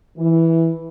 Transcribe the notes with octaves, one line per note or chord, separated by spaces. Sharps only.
E3